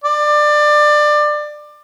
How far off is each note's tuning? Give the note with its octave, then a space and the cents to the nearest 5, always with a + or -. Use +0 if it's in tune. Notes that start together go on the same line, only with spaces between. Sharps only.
D5 +25